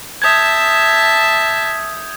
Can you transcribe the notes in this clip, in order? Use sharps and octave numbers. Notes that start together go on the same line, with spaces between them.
E5 A5 D#6 G6 G#6